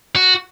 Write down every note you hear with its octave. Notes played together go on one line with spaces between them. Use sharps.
F#4